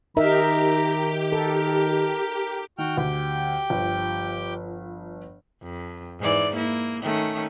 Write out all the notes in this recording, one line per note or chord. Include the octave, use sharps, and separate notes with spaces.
D#3 D#4 G4 A#4 E5 A#5
A4 A#4
D#3 F#4 G5 F6
D2 G4 G5
G1 F3
F2
G#2 E3 D5
A#3 E4
D#3 A3 C#4